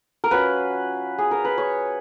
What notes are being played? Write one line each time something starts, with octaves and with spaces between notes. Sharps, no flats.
A#4
F#3 C#4 F4 B4
G#4
A#4
B4
C#5